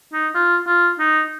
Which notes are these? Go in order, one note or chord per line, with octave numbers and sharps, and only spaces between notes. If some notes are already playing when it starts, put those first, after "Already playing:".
D#4
F4
F4
D#4